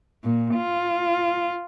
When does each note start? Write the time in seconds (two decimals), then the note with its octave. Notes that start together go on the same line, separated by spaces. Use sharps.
0.24 A#2
0.57 F4